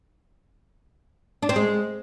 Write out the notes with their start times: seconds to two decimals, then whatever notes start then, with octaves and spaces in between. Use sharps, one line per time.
1.42 D4
1.49 C4
1.56 G#3